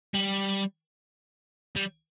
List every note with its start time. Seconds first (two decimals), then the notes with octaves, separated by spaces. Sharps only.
0.14 G3
1.76 G3